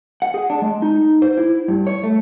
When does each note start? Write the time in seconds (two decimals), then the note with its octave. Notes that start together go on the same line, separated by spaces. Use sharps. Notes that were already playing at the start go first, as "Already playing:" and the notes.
0.22 F#5
0.34 G#4
0.50 D4
0.62 G#3
0.82 D#4
1.22 C5
1.38 E4
1.68 G2
1.87 C#5
2.03 A3